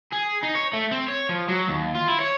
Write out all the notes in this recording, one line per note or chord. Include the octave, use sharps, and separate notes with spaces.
G#4
D#4
C#5
A3
C4
C#5
F3
F#3
D#2
F4
E4
C#5